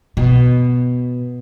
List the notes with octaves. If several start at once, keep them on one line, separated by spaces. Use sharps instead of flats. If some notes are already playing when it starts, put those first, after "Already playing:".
B2